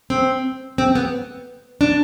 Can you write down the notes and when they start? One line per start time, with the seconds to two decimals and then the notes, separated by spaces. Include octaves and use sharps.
0.10 C4
0.78 C4
0.95 B3
1.81 D4